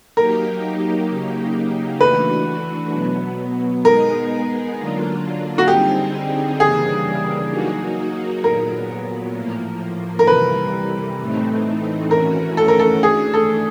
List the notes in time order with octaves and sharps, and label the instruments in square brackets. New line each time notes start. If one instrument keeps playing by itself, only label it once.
[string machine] F#3 A#3 D#4 G4 [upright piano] A#4
[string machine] C#3 F#3 A#3 D#4 G4
[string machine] E3 A3 D4 F#4 [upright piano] B4
[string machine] B2 F#3 B3
[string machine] G#3 B3 D#4 G#4 [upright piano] A#4
[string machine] D3 F#3 A#3 D4 F4
[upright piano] F#4
[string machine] D3 G3 C4 D#4 G#4 [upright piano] G4
[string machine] C#3 E3 G3 A#3 D4 [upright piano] G#4
[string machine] F#3 A#3 D#4 F#4
[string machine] A#2 F#3 B3 [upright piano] A#4
[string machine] A2 F3 A#3
[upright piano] A#4
[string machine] C3 E3 G3 [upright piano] B4
[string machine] A2 E3 A3 C4 D#4
[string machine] E3 A3 C#4 F#4 [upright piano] A#4
[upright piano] A4
A#4
A4
[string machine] E3 A3 D4 [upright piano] G#4
[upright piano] A4